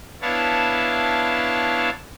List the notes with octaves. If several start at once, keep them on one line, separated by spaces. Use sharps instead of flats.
B3 D4 E4 C#5 F5 A5